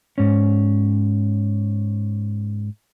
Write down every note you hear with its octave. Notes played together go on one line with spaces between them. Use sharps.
G#2 C#4